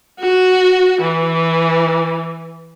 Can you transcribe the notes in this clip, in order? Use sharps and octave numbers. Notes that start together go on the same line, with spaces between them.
F#4
E3